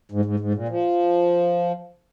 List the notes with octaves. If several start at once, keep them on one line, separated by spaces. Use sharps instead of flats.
G#2
G#2
G#2
A#2
F3